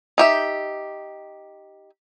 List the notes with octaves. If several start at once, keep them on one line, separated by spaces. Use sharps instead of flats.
D#4 G4 E5